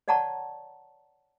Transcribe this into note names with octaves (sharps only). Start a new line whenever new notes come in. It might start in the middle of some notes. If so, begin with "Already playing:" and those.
C#5 D5 F#5 A5 A#5 C#6